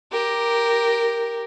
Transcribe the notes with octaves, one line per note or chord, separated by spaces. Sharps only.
G4 A#4